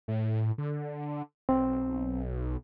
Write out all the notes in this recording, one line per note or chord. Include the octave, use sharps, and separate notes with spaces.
A2
D3
B1 C4